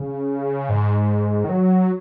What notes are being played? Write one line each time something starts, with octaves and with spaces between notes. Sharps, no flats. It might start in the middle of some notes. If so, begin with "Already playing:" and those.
Already playing: C#3
G#2
D#3
F#3